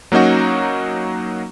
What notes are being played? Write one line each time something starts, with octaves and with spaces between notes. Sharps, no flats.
F#3 A#3 C#4 D#4 F#4